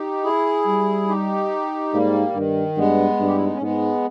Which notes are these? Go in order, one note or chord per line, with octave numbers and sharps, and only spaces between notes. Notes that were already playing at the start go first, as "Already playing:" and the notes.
Already playing: D#4 G4
E4 G#4
G3
D#4 G4
G#2 G3 A#3
G2 D#3
G2 G#3 B3
G2
G4
E4
D#4
C#4
G#2 G#3 B3